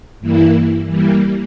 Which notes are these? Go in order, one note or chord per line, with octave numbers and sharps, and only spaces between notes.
G2 E3 A#3 E4
E3 G3 A#3